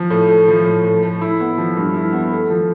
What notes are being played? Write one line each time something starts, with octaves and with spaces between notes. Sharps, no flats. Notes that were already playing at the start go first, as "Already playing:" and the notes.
Already playing: F3
A2
A3
F3
A2
A2
A3
E4
B3
F3
G2
E4
B3
A3
F3